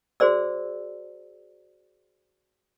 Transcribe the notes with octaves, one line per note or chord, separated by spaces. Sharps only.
F#4 G#4 C5 D5 E6